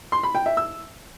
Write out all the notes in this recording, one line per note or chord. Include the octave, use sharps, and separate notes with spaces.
C6
B5
G5
E5
E6